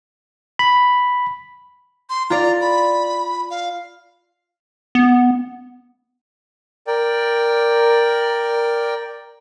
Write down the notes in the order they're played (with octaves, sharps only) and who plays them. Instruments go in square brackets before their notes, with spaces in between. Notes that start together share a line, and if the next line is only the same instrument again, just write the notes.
[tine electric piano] B5
[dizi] C6
[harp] F4 D5 [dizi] A#5
[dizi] B5
F5
[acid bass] B3
[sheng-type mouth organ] A#4 D5 G5